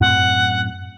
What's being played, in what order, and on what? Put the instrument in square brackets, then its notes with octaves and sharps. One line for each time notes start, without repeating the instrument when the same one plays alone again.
[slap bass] F#2 A2 C4 [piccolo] F#5